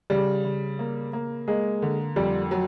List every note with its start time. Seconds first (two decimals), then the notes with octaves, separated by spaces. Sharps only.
0.10 C#3 G3
0.44 C#3
0.79 A#3
1.13 A#3
1.48 G#3 A#3
1.82 D3
2.16 F2 G3
2.51 F#3